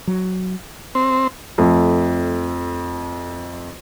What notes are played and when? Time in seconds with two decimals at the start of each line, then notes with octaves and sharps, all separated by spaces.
0.07 F#3
0.95 C4
1.58 F2 A3